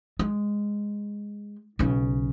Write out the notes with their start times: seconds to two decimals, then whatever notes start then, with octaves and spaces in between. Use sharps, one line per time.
0.19 G#3
1.79 B1 C#3